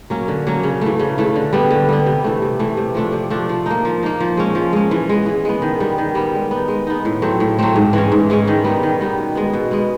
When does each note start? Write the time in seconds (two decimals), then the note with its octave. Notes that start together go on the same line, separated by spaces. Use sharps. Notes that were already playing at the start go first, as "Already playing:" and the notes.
0.10 F#3 A#3 C#4
0.28 D3
0.47 F#3 A#3 C#4
0.63 C#3
0.81 E3 A3
1.00 C#3
1.18 E3 A3
1.36 D3
1.53 G3 B3
1.71 D3
1.89 G3 B3
2.06 C3
2.24 E3 A3
2.42 C3
2.59 E3 A3
2.77 C3
2.95 F3 A3 D4
3.13 C3
3.30 F3 A3 D4
3.49 F3
3.66 A#3 D#4
3.85 F3
4.03 A#3 D#4
4.20 F3
4.37 G#3 C#4
4.55 F3
4.73 G#3 C#4
4.91 E3
5.09 G#3 B3
5.26 E3
5.45 G#3 B3
5.62 D#3
5.80 G3 B3
5.98 D#3
6.15 G3 B3
6.34 G#3
6.51 B3 D#4
6.68 G#3
6.87 B3 D#4
7.05 A2
7.22 F#3 A3 C4
7.40 A2
7.59 F#3 A3 C4
7.76 G#2
7.93 E3 G#3 C#4
8.12 G#2
8.30 E3 G#3 C#4
8.48 D#3
8.64 G3 B3 D#4
8.83 D#3
9.01 G3 B3 D#4
9.18 B2
9.35 G#3 B3
9.53 B2
9.71 G#3 B3